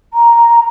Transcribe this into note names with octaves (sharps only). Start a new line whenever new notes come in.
A#5